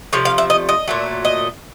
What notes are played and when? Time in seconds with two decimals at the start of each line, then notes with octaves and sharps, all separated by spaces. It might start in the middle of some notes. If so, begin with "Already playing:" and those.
0.13 C3 F3 A3 C#5
0.25 F5
0.38 E5
0.50 D#5
0.69 D#5
0.88 A#2 F#3 A3
1.25 D#5